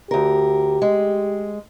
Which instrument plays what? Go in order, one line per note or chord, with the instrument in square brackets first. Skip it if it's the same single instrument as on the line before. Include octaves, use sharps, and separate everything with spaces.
[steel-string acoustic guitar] D2 A#4 [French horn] G4
[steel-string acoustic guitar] G#3